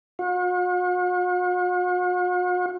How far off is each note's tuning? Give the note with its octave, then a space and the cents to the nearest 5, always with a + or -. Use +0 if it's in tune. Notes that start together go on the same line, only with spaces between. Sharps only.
F#4 -45